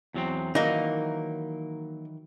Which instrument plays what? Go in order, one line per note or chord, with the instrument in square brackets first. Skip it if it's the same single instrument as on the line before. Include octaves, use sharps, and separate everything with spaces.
[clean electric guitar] E2 F#3 C4
[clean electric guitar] D#3 E3 F#3 [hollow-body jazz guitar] A#3 D#4